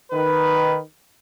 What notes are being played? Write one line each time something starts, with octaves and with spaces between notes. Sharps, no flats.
D#3 B4